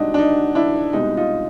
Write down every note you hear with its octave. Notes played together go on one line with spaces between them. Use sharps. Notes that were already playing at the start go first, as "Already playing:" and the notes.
Already playing: C2 G#3 D4 D#4 F#4
D4
D#4
D4 E4
C2 B2 G#3 D#4
D#4 F4